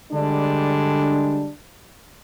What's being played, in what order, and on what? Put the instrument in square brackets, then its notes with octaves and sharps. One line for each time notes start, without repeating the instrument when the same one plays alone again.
[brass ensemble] D3 G3 G#3 D4